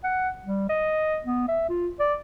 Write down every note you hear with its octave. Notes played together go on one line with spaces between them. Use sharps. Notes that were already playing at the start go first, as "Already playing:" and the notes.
F#5
G3
D#5
B3
E5
F4
D5